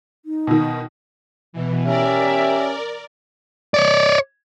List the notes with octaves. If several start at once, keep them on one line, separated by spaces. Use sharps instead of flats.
D#4
B2 D#3
B2 E3
C#4 G4 A#4 D5 E5
C#5 D5